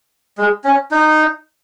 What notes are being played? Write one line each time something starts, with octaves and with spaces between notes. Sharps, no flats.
G#3
C#4
D#4